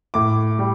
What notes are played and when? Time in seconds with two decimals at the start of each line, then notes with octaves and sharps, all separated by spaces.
0.14 A2 D6
0.59 G3